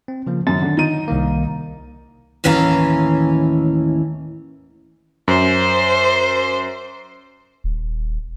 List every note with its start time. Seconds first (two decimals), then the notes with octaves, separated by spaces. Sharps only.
0.08 C4
0.27 C#3 F3 A#3
0.47 F#2 D#3 A6
0.62 D3
0.77 D#4 D#7
1.08 C2 D#3 A#3
2.44 D#2 A2 E3 C#4 F5 A#5
5.28 F#2 C5
7.64 D#1